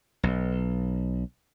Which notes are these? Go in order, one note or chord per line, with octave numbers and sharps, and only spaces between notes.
B1